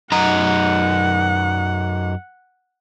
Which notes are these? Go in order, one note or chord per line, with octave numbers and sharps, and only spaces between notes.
F#2 D#4 F#5 A#5